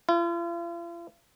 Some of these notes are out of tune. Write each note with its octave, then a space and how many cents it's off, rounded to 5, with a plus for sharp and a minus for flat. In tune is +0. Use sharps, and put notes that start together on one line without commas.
F4 -45